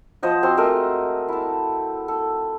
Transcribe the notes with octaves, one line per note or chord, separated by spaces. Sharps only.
F3 C5 D#5 F#5
C4 F#4 C5 C6
G#3 A3 A#4 D#6
E4 A5
A4